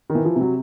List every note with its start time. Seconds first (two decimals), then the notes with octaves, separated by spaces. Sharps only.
0.10 D#3
0.15 E3
0.25 F3
0.36 C3
0.41 F#3